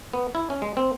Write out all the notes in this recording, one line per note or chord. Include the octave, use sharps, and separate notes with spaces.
B3
E4
C#4
G#3
C4